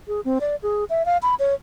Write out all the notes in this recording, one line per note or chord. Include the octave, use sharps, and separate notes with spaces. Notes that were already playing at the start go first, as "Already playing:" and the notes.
G#4
C4
D5
G#4
E5
F5
B5
C#5